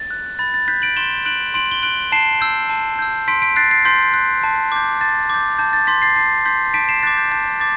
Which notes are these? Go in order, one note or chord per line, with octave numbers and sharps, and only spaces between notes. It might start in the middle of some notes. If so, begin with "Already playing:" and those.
Already playing: A6
F#6
B5 A6
A6
F#6 G6 B6
D7 F#7
C6 E7 G7
F#6 D7 F#7
C6 D7 F#7
G7
F#6 D7 F#7
A5 C7 E7
E6 G6
A5
E6 G6
C6 B6 D7
B6 D7
F#6 A6 C7
A6 C7
C6 G6 B6
F#6
A5
D6 G6
A5 A6
D6 G6
A5 G6
A6
C6 G6 B6
A6 C7
A5 A6 C7
C6 G6 B6
A5 B6 D7
C7 E7
D6 F#6 A6
G6
A5 G6
D6 A6